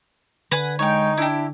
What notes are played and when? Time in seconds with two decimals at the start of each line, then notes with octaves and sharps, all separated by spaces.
0.51 D3 B4 F#5 G#5
0.79 G#3 D#4 C#5 G5
1.18 D4 E4 G4